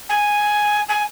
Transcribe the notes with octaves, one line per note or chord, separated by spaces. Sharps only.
G#5
G#5